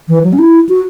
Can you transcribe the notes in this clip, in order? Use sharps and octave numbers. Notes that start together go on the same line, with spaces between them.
E3
F#3
C#4
E4
F#4